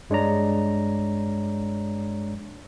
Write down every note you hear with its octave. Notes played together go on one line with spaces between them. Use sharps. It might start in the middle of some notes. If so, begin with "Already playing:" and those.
G2 G#3 D4 C#5 D5 A#5